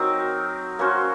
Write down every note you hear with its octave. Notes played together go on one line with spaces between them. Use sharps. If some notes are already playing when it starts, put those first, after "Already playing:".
Already playing: F#3 C4 D#4 A#4
A#3 C#4 F#4 C5